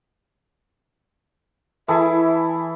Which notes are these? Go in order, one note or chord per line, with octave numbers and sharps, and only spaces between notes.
E3 E4 G#4 A4 E5